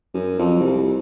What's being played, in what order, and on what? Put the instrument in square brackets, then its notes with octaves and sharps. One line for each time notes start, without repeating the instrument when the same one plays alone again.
[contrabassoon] F#2
F2
C2